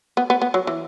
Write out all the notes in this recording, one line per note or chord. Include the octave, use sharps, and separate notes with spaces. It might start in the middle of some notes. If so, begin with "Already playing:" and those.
B3
B3
B3
F#3
E3